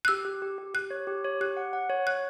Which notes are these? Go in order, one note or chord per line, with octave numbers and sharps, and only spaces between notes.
F#6
G4 E6
G4
G4
G4
G4 F#6
C#5
G4
C#5
G4 F#6
F#5
F#5
C#5
C#5 F#6